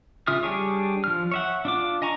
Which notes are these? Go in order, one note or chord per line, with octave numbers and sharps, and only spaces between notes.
C#3 F4 E5 D#6 F6
G3 D4 G#4 C#5
F3 F6
C#5 E5 F#5
D4 F4 D6
D#5 G#5 A#5 C#6